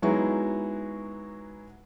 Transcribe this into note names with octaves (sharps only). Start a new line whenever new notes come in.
F#3 G#3 B3 D#4 E4 F#4